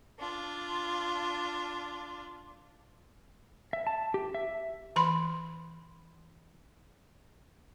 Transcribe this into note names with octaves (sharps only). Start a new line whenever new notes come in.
D4 F4
E5
A5
G4
E5
E3 B5 C6